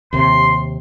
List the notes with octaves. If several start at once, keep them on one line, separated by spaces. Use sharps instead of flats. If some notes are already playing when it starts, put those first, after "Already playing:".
D#2 C3 C6